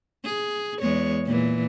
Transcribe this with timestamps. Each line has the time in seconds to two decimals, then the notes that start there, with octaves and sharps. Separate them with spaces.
0.24 G#4
0.81 E2 G#3 C#5
1.25 A#2 E3